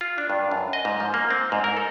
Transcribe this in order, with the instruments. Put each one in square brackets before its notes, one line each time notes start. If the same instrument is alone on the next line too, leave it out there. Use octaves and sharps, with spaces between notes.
[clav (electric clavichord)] F4
D4
G2
F#2
D#5
G#2
F3
A#3
C4
G#2
A#4
A4